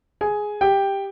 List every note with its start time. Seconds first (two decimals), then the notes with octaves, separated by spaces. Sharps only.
0.21 G#4 G#5
0.61 G4 G5